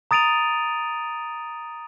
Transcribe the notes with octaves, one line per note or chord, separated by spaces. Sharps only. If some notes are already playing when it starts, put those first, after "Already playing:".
A#5 D#6 A6 D7 D#7 F7